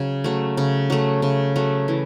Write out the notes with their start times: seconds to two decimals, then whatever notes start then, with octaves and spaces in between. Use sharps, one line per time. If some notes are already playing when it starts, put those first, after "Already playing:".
Already playing: C#3 F#3
0.24 F#3 A3
0.57 C#3
0.90 F#3 A3
1.22 C#3
1.56 F#3 A3
1.88 E3